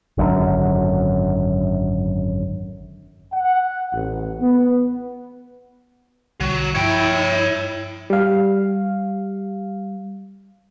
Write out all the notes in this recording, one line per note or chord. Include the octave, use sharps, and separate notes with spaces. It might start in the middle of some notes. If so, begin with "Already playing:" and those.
G#1 F#2 D3
F#5
A1
B3
B1 D3 F#3 G3
G2 F3 E4 C#5 G5
G3 F5